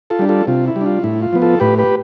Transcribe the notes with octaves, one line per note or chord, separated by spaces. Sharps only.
F4 A4
G3 D4
F4 A4
C3 F4
E4
G3
D4 F4
A2 E4
F4
F3 B3
F4 A4
A2 G4 B4
G4 B4